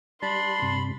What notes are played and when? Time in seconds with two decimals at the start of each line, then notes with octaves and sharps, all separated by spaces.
0.22 G3 D4 B5 C6
0.62 G2 C3